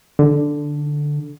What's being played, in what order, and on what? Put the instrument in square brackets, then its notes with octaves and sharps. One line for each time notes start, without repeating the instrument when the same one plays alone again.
[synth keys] D3